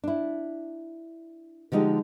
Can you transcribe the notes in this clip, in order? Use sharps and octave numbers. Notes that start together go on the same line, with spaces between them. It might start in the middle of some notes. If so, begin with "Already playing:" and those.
D4 E4
D3 F3 G#3 D#4 G4